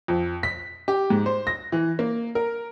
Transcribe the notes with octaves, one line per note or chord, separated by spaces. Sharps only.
F2
B6
G4
G#2
C5
A#6
E3
A#3
A#4